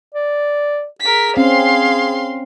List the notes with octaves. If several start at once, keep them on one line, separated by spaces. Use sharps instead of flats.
D5
G#4 A#4 B6
C4 C#4 F5 C6